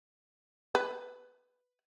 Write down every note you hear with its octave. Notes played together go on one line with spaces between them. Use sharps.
B4